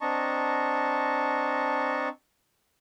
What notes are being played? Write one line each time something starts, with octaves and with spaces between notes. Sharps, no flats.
C4 D4 D#5 A5 A#5 C#6